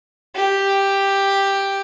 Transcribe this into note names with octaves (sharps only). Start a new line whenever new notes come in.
G4